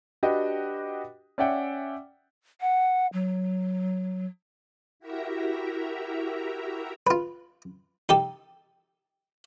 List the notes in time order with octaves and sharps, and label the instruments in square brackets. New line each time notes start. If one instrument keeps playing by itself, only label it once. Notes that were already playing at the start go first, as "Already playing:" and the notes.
[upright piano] D4 F#4 G4 B4 D#5 G5
C#4 D5 E5 F#5 G5
[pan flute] F#5
F#3
[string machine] E4 F#4 G4 A#4 E5 A#5
[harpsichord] F4 B4
D#4 G4 A4